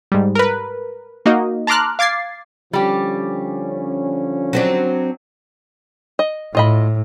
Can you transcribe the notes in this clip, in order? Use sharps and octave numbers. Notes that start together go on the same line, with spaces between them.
G#2 G3
A#4 B4
A#3 D#4 F#4 D#5
A5 A#5 C6 D6 F6 F#6
F5 D6 G#6 A6 C7
D3 F3 G3 C#4 G4
F#3 C4 D4
D#5
A2 F4 D#5 B5